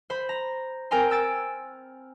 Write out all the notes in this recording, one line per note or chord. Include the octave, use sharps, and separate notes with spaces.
C5 B5
A#5
C4 A#4 G5 G#5 A#5 C6
G#5 E6 A6 D7